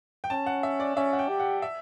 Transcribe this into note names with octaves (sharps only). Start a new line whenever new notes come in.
G5
C#4 A5
F#5
E5
D5
C#4 E5
F#5
G5
G4
F#5
E5